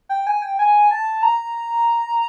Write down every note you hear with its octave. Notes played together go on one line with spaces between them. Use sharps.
G5
G#5
G5
G#5
A5
A#5